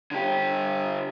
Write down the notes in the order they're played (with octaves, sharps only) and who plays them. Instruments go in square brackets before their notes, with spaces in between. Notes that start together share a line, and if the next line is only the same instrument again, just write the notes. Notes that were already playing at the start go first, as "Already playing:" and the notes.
[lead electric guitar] D3 G4